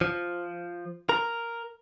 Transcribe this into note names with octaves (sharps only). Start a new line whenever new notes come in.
F3
A#4